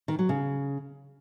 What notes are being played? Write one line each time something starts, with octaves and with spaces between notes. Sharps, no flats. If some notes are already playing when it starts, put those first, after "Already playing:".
D#3
F#3
C#3